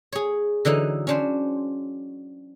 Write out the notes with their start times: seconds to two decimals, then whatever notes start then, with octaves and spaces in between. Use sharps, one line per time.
0.12 G#4 C#5
0.65 D3 E3 F#3 D#4
1.07 C#4 D4 C5